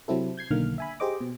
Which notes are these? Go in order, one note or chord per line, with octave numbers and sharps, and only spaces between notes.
C3 F#3 C4 E4 A4
G6 G#6 C7
B1 D3 D#3 A#3 F6
E5 G#5 B5
G4 G#4 C5 D#5 D6
B2